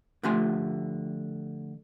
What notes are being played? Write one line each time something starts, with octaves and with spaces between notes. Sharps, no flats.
D3 F3 A3 G4 G#5 C6